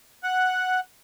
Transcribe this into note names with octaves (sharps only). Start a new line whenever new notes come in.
F#5